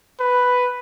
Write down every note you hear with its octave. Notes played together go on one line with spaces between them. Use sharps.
B4